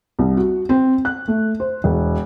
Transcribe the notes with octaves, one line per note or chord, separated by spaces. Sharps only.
C2
F#4
C4
F#6
A3
C5
E1